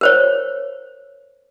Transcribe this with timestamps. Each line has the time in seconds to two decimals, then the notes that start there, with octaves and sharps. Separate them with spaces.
0.01 A#4 C5 C#5